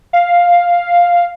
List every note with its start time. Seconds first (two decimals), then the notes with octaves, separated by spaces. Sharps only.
0.13 F5